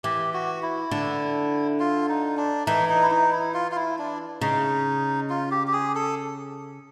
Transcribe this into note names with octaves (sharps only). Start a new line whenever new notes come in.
E3 G4
F#4
E4
D3
F4
D#4
D4
E3 D#4
D#4
E4
D#4
E4
F4
F4
E4
D4
C#3 D#4
F4
G4
G4
G#4
A4